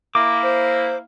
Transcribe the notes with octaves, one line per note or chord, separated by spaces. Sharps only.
A#3 E4 D6
C5